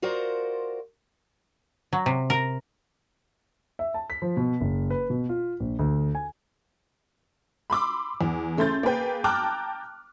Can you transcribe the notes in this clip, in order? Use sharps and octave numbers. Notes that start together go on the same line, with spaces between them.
F4 F#4 A#4 C5 D5 F#5
F#3
C3
A#4
E5
A5
B6
F3
B2
F#1
B4
B2
F4
A#1
D2
G#5
B5 C6 D6 E6
E2
C#3 A3 C6 G6 A6
A#3 G#4 B4 G5
G5 A5 A#5 D6 F6 F#6